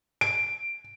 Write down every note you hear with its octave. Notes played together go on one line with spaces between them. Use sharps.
D7